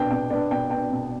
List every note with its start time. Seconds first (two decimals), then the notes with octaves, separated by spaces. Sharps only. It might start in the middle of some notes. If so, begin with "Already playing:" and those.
Already playing: B2 B3 D4 G5
0.11 B2 G5
0.30 B3 D4 D5
0.51 B2 G5
0.70 B3 D4 G5
0.92 B2